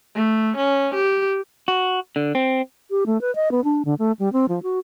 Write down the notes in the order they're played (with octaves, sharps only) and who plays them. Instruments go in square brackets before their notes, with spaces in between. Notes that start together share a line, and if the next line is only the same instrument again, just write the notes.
[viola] A3
C#4
G4
[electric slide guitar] F#4
D3
C4
[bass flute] G4
A3
B4
D#5
B3
D4
D3
A3
G3
C4
F3
F#4